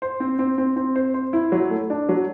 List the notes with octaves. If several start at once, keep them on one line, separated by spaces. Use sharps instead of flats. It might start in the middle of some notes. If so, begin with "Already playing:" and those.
C5
C4
C4
C4
C4
C5
C5
E4
F#3
A3
D4
F#3